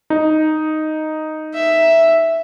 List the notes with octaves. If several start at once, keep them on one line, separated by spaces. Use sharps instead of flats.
D#4
E5